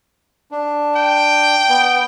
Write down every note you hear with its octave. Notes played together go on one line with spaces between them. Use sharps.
D4
G5
B3